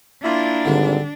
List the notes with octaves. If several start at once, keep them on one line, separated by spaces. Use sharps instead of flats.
A#3 D4 E4 F4
G#1 D3 G3